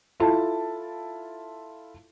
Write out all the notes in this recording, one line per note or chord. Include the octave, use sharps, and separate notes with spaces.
E4 F4 A4 A5